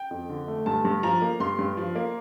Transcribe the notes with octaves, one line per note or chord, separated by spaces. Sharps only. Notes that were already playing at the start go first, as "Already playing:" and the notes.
Already playing: G5
F2
D3
A3
G2 A5
G2
F3 A#5
A#3
G2 C6
G2
F3
A#3